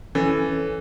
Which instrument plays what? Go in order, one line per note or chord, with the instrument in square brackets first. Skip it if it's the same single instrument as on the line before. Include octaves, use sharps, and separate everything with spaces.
[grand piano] E3 [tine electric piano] C#4 [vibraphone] A4